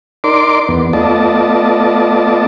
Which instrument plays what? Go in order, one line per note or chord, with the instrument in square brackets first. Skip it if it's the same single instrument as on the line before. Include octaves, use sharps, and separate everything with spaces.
[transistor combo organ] D#4 A#4 D5 C6 D6
E2 B3
A3 B3 F4 D5 D#5 A5